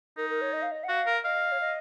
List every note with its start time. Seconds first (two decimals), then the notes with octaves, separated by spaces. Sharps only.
0.17 D#4 A#4
0.30 A#4
0.41 C#5
0.53 D#5
0.62 F5
0.71 D#5
0.84 F#5
0.89 F#4 F5
1.06 A#4
1.24 D#5 F5
1.52 C#5
1.60 D#5